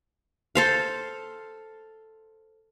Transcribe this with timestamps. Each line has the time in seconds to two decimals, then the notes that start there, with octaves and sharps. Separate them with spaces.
0.55 A4 C5 F5